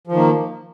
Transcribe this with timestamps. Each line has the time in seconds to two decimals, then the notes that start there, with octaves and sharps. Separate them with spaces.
0.07 F3
0.12 D#3
0.17 A#3